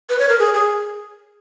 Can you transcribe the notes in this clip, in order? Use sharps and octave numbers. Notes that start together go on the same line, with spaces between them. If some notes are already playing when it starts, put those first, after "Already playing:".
B4
C#5
A#4
G#4
G#4